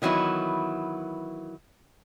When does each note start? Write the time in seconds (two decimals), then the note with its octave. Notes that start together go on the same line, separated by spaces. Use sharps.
0.02 D#3 E3 F#3 B3 E4